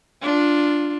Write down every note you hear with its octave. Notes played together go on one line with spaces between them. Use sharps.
D4 F4